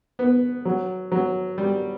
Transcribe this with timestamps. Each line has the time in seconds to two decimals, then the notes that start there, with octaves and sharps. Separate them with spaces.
0.19 B3
0.65 F#3
1.12 F#3
1.58 G3